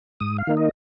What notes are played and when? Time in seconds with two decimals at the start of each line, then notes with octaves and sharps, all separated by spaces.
0.20 G#2 D#6
0.38 F5
0.47 D#3 A#3 D#4
0.57 D#5